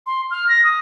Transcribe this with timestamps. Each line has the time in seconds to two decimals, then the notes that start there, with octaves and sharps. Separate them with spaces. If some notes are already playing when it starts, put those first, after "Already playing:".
0.07 C6
0.31 F6
0.49 A#6
0.64 D#6